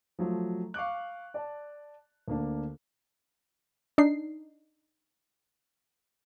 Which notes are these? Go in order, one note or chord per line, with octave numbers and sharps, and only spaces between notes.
F3 F#3 A3
F5 C#6 D6 F#6
D5 A5
D2 A#3 D4
D4 D#4 C7